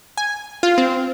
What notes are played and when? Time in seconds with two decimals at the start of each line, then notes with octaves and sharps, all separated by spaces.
0.18 G#5
0.63 F4
0.78 C4